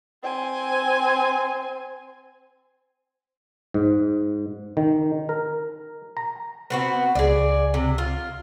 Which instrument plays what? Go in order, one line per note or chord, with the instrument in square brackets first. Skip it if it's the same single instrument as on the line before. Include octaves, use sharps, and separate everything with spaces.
[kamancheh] C4 G#5
[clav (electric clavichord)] G#2
D#3
A#4
A#5
[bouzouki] B3 C4 F#4
[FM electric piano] C#2 [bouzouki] G#4 D5
[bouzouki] C3
F4